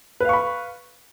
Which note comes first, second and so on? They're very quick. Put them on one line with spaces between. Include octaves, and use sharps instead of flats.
B4 F5 C#6 B5